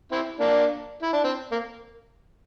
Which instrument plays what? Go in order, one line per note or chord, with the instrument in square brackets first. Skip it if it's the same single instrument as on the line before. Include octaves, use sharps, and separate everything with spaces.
[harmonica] C4 E4
A#3 D4
E4
D4
C4
A#3